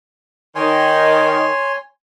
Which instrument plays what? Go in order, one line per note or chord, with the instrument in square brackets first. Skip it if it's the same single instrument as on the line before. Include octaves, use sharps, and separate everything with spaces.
[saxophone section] D#3 [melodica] C#5 G#5 C6